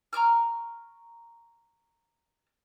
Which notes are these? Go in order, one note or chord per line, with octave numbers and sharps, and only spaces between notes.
A#5 C#6 D6 F6